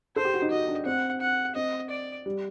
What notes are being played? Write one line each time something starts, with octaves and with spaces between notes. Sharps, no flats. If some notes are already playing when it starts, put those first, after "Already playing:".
A4 C5
G4
F#4
D#4
F#4 D#5
D4
C4 F#5
F#5
C4 D#5
D5
G3